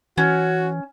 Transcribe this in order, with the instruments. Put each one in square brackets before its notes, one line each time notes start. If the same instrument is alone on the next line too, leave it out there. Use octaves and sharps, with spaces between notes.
[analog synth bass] E3 [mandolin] C#4 [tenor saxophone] F#4